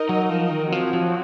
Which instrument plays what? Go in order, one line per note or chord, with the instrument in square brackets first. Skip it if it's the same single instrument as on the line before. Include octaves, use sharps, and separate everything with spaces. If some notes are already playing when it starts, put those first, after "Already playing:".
Already playing: [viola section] D#4 A#4 D#5
[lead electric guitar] F#3
F3
D#3
[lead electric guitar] F3 [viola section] F#3 C4 F#4
[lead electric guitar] F3